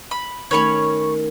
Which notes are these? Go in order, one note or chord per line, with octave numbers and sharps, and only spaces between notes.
B5
D#3 A3 C#4 C#5 B5 C#6